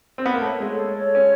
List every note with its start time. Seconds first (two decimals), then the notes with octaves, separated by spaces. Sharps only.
0.18 C4
0.26 B3
0.34 A#3
0.41 A3 C#5
0.60 G#3
0.70 A4
0.97 C#5
1.15 C#4